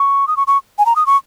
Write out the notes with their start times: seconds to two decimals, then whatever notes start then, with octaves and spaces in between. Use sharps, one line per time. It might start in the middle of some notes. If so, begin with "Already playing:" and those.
Already playing: C#6
0.28 D#6
0.37 C#6
0.47 C#6
0.78 G#5
0.86 A#5
0.96 D#6
1.07 C#6